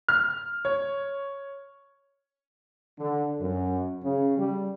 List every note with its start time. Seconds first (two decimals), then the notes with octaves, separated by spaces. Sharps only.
0.08 F6
0.65 C#5
2.98 D3
3.39 F#2
4.03 C#3
4.36 G3